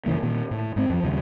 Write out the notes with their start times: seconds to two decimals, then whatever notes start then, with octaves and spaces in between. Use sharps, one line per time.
0.06 F#2 C#3 E3 A#3
0.23 A#2 D#3
0.51 A2
0.76 G#2 C4
0.90 F2 F3
1.04 D#2 C#3 G3